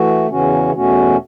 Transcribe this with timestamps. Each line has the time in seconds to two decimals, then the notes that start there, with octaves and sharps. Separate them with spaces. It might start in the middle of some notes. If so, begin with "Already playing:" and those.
Already playing: E3 A3 F#4
0.29 E2 C#3 E3 C#4 F#4
0.73 E2 B2 A3 C#4 F#4